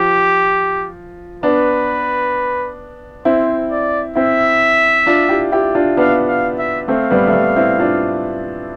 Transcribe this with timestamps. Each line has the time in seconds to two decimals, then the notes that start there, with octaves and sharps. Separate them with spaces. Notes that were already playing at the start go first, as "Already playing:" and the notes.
Already playing: F3 G4
1.43 B3 D4 B4
3.25 C4 E4 C5
3.71 D5
4.15 C4 E4 E5
5.06 D4 F4
5.29 E4 G4
5.52 E4 G4
5.75 D4 F4
5.97 B3 D4 F5
6.28 F5
6.59 E5
6.88 A3 C4 F5
7.10 G3 B3
7.27 A3
7.33 G3
7.56 C4 E4
7.79 D4 F4